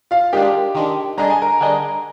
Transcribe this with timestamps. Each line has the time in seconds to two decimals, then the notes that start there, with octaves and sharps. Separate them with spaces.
0.11 F4 F5
0.33 D#3 G#3 D4 G4 G5
0.75 D#3 G#3 D4
1.18 D3 G3 D4 G#4 D#5 A#5
1.30 G#5
1.42 A#4 A#5
1.60 D3 G3 D4 G#4 D#5